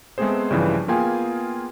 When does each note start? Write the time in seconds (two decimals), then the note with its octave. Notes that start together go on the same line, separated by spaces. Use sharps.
0.18 G#3 A3 B3 C4 G#4 C5
0.51 G2 C#3 E3 F3
0.88 A#3 B3 F4 G#4 G5 G#5